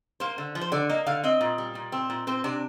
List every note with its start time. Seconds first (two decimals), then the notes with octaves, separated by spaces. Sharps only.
0.20 A#3 C5
0.38 D3
0.55 F3
0.61 C5
0.72 D3 D5
0.89 A#3 D#5
1.06 D3 F5
1.24 C4 D#5
1.41 A#2
1.58 G3
1.75 A#2
1.92 C4
2.10 A#2
2.27 C4 C5
2.44 C3 D4